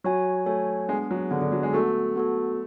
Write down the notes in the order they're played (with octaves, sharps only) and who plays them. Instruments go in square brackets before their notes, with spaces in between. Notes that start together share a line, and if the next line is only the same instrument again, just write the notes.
[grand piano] F#3 [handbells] F#4 C#5 G#5
[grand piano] A3 [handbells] F#4 C#5 G#5
[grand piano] G#3 [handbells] B3 D4 G#4
[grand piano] F#3
[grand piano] D3 [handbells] B3 D4 G#4
[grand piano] D3
F#3
G#3
[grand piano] A3 [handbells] B3 F#4 A4
[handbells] B3 F#4 A4